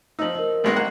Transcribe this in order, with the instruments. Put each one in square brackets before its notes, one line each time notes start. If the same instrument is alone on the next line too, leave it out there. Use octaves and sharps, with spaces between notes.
[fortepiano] F3 D#4 [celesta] E6 F#7
[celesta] A#4 D#5
[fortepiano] G#1 G#3 B3 [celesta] A#6 C7 F#7
[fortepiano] A#3 F#5